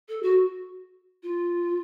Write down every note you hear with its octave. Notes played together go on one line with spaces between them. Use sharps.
A4
F#4
F4